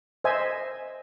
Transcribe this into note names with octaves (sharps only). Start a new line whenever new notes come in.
C5 D#5 E5 G#5